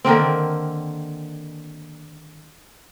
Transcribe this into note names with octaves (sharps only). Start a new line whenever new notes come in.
D3 D#3 A#3 C4